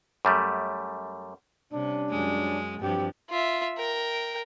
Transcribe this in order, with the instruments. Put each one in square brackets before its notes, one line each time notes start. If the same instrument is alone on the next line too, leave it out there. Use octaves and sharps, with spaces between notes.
[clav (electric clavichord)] F#2 G3 A3
[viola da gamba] C3 [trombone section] G3 C#4 D4
[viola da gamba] F#2 G#3
[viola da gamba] G2 F3 [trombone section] F#3 C4 G4
[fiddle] F4 E5
A#4 G5